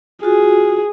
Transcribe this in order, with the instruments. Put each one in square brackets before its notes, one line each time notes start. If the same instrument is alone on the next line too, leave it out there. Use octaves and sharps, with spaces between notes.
[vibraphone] F4 F#4 [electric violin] G#4